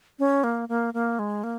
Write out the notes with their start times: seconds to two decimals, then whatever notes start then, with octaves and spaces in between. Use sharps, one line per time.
0.19 C#4
0.44 A#3
0.69 A#3
0.94 A#3
1.19 G#3
1.44 A#3